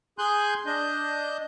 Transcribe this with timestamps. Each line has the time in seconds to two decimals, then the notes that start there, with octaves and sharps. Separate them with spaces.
0.19 G#4 G#5 C6 F#6 G6
0.66 D4 D#5 G6